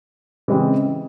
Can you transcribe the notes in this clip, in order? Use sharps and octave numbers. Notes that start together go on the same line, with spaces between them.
C#3 E3 G#3 C4